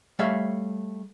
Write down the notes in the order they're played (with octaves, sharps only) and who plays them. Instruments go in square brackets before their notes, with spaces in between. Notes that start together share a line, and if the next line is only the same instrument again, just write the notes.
[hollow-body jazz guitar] G3 A3 C#5 E5 F5